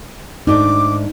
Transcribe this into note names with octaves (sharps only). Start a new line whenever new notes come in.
G#2 A3 D4 D#4 D6